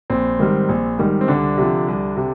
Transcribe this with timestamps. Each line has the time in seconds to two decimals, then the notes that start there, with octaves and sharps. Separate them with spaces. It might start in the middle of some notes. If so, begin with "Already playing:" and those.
0.10 A#1 C4
0.39 G#2 D#3 G3
0.69 A#1
0.98 G#2 D#3 G3
1.21 C4
1.28 C2 D3 D4
1.58 C3 F3
1.88 C2
2.17 C3